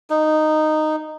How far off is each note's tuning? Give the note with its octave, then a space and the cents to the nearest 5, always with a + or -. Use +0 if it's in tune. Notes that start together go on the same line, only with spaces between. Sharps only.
D#4 -10